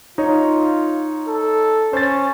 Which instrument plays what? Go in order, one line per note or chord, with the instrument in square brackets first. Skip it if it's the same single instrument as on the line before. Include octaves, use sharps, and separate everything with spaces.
[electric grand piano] D#4 C#5 [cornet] F4
[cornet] A4
[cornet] C#4 [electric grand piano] C5 A6